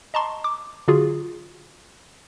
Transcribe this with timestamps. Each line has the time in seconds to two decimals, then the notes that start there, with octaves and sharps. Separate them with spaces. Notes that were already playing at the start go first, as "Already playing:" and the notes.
0.14 D#5 A5 A#5 C6 C#6
0.44 D6
0.88 D3 F#3 F4 F#4 G#4